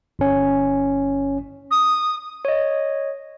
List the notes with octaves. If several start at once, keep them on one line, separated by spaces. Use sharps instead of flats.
G1 C#4
D#6
C#5 D#5